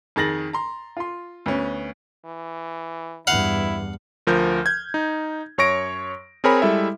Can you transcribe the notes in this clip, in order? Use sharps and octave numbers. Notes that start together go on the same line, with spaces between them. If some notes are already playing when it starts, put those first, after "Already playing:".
F2 D#3 G#4 A6 A#6 F#7
A#5 C6
F4 C6
D2 B3 C#4
E3
E2 G2 E4 F5 F#5
D2 F3 A#4 F6 G6
G6 G#6
D#4
F#2 C#5 C#6 A#6 D7
C4 G#4 A#4 C#5 G#5 B5
G3 G#3 E4 A4 E5